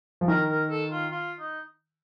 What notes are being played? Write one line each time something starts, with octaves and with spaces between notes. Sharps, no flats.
F3
D#3 A#4
A#4
A4
F4
F4
D#4